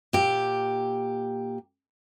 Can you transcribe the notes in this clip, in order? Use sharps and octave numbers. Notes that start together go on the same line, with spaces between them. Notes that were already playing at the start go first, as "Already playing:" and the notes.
A#2 G4